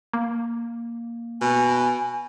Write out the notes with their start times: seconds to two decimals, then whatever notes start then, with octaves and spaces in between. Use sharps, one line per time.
0.13 A#3
1.41 B2 G#5